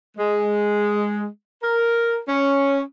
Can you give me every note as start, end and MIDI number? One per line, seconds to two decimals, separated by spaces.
0.17 1.25 56
1.63 2.17 70
2.28 2.78 61